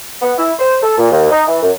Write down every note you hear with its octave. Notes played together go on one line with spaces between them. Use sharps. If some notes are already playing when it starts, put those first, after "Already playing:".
B3
E4
C5
A4
A#2
D#2
D#4
E3
F#2